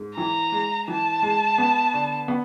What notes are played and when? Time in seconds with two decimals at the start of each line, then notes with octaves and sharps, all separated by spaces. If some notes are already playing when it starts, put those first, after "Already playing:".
Already playing: G#2
0.17 E3 A#5
0.52 G#3
0.88 E3 A5
1.23 G#3
1.58 B3
1.94 D3
2.28 B3